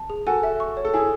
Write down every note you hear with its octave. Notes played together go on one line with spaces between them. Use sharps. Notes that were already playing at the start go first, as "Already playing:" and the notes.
Already playing: A5
G#4
F#4 A4 G#5
E5
C#6
C#5
A4
E4 G#4 G#5